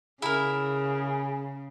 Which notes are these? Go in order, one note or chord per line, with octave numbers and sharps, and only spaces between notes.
C#3 E4 G#4 A#4